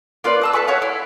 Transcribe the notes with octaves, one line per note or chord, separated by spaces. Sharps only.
A#3 F4 B4 D5
D#5 A5 E6
A4 B4 G#5 C#6
F#4 C#5 E5 F5
E4